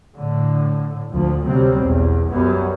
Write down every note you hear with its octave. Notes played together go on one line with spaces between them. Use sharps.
A2 D3
D2 F3
D2 C3 F#3 G3 C4
B1 E2
F#2 G3 B3